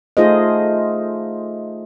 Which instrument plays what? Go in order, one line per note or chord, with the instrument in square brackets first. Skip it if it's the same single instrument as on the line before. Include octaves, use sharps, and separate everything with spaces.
[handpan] A3 D#4 F4 G#4 C5 D#5